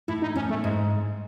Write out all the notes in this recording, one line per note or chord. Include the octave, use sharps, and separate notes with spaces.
A2 E4
D#4
A2 C#4
A3
G#2 G#3